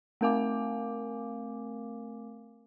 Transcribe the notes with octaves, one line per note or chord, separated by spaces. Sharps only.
A3 C4 A#4 F5 G#5 D6